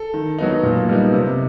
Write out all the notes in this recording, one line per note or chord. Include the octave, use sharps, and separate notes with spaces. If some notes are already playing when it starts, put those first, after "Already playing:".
Already playing: A4
D#3
F#3 B3 D#4
A#2
G3 B3 D#4
C3